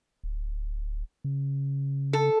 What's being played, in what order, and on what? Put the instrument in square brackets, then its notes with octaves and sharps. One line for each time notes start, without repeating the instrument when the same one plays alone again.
[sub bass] D1
C#3
[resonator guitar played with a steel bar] A4